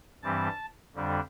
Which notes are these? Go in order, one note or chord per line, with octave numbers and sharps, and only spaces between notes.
G2 E3 G3 C4 A5
F2 D3 G3 D4